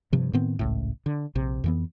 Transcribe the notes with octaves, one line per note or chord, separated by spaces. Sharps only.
G2 C3 F3
A2 D#3 B3 C4
G#1 C#2 A2
D3
A#1 C3
F2 E3 B3